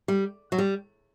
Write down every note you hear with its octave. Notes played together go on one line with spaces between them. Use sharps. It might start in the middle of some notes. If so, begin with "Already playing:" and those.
G3
F#3
G3